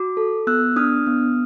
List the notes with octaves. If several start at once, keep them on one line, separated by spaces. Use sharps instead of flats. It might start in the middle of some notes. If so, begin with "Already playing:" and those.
Already playing: F#4 D6
A4
B3 E6 F#6
D4 D#6 F6
B3